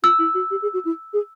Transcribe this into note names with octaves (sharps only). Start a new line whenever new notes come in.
F4 E6
E4
F#4
G4
G#4
F#4
E4
G#4